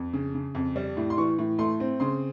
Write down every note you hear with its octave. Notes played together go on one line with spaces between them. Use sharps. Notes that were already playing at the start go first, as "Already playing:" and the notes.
Already playing: F2
C#3
C#3
F2
G3
A2
C6
E3 C#6
A2
A3 C6
C4
C#3 C6